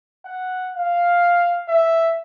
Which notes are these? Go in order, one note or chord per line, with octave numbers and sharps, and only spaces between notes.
F#5
F5
E5